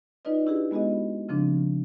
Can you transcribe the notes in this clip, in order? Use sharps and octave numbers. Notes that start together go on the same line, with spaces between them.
D#4 F4 B4 D5 D#5
D4 E4 G4 G#4 B4
G#3 B3 F#4 G#4 D#5
C#3 F3 C4 D4